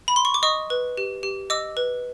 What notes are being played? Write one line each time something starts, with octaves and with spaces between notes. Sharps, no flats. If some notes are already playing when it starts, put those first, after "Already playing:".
B5
C6
C#6
D6
D#5 C#6 D#6
B4
G4
G4
D#5 D6 E6
B4